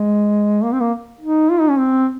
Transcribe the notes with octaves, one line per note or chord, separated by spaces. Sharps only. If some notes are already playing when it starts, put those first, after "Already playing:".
Already playing: G#3
A#3
C4
A#3
D#4
F4
D#4
C#4
C4